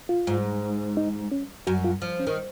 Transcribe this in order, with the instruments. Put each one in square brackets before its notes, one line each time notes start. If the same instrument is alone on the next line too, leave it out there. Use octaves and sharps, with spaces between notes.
[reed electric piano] F4
[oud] G#2
[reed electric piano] D#4
C#4
[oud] F#2 [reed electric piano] F#4
[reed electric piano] F4
[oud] F3
[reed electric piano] C#4
[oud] D#3